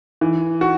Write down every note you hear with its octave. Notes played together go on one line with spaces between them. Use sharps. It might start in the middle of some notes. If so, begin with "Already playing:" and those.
E3
F#4